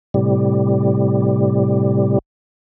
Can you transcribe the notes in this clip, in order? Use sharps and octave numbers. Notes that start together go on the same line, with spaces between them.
A2 C3 G3